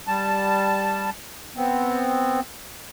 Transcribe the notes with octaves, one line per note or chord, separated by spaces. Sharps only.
G3 A5
B3 C4